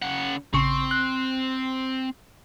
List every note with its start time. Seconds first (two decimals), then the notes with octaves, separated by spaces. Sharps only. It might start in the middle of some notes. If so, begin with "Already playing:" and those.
0.03 C#3 F#5
0.54 A1 C#3 C4 C#6
0.91 F#6